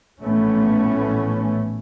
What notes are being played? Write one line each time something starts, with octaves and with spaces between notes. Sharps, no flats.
A#1 A2 E3 A3 B3 C#4